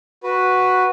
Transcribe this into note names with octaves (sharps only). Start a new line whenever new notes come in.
F#4 B4